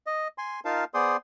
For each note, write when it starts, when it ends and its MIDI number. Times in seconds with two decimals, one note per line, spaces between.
0.07 0.28 75
0.38 0.60 80
0.38 0.60 84
0.65 0.84 63
0.65 0.84 65
0.65 0.84 70
0.65 0.84 77
0.65 0.84 81
0.94 1.17 59
0.94 1.17 68
0.94 1.17 72
0.94 1.17 74
0.94 1.17 84
0.94 1.17 87